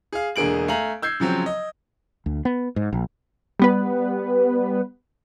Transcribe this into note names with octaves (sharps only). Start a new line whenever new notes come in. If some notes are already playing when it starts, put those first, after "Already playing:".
G#4 F5
E1 D3 A#3 G#4 D7 F#7
A3 F5 G#5 A#5 F#7
E6 G6 G#6 C7
C#3 F3 F#3 C4
D#5
D2
B3
G#2
A#1
G3 B3 B4